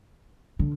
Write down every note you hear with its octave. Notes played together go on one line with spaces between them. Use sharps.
D3